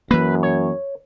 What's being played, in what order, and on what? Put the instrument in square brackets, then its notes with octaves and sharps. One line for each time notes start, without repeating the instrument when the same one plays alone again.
[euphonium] F#2 [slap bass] E3 A#3 [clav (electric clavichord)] B4
[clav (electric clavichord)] C#5